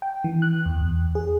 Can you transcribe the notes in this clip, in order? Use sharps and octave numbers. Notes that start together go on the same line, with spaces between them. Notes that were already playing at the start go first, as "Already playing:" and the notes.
G5
E3
F#6
E2
E2
G#4